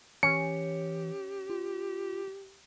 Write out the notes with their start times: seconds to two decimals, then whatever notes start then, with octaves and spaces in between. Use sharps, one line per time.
0.23 E3 C#4 G4 C#7
1.50 F4